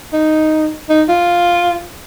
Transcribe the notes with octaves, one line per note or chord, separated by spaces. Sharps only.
D#4
D#4
F4